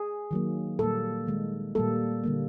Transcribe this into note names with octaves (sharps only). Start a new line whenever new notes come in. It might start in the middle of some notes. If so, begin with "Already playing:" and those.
Already playing: G#4
D#3 F#3 A#3
A#2 G3 A#3 A4
D#3 G#3
A#2 G3 A#3 A4
D3 G3 A#3